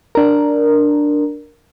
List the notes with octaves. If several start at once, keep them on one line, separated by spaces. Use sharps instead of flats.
D4 A#4